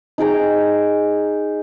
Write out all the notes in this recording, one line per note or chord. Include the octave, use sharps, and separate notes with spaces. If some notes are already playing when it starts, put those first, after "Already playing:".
D#4 G#4 G5 A#5